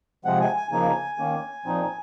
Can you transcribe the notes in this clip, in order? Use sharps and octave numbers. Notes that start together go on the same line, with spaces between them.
C3 F3 G#3 C4 F#5
G#5
G#5
C#3 F3 A#3 D#4 G#5
D#3 A#3 C#4
A#2 F3 C4 D#4